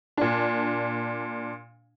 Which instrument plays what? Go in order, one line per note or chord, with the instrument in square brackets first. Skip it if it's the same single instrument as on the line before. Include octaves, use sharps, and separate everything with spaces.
[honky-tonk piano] A#2 D4